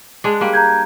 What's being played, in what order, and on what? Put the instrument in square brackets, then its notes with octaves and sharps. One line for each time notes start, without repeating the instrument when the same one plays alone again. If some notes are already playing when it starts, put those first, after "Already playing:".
[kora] G#3 D4
G3 A#3
[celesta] A#5 G6 G#6